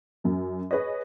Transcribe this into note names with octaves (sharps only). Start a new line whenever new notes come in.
F#2 F#3
G#4 B4 C#5 D#5